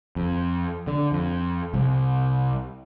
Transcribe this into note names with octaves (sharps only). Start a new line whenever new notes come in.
F2
D3
F2
C2